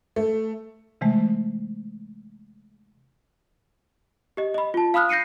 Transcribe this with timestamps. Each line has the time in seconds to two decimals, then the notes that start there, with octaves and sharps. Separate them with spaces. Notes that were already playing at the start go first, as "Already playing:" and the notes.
0.16 A3
1.01 C3 E3 G#3 A3
4.37 G4 D#5
4.54 D#5 B5
4.74 F4 A5
4.94 F5 B5 D#6 F6 F#6
5.09 G6 A#6 C7 C#7 D#7